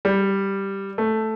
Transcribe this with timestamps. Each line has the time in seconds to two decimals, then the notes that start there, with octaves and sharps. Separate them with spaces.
0.05 G3
0.98 A3